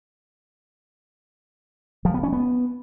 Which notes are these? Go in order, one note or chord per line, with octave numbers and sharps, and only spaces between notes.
F3
B3
C#4
B3